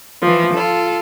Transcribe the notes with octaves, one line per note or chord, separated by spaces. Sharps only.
E3 F3
F4 A4